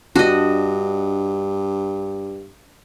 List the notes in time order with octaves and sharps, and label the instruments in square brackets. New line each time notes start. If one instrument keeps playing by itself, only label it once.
[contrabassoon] G2 [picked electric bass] D4 [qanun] F#4 D#5